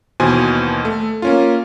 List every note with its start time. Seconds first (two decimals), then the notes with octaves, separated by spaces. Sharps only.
0.20 D#2 B2 E3 C5 G#5
0.85 A3
1.22 A#3 C#4 F4